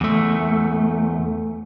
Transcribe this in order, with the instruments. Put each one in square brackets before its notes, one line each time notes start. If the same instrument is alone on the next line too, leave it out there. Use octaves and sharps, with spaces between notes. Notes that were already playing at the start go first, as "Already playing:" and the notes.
[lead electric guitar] E2 A3